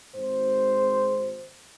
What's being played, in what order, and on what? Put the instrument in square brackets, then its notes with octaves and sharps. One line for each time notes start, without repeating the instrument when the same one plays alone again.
[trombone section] G#1 C5